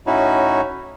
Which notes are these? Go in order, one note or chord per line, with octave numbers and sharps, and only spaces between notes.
A2 C#4 D#4 E4 F#4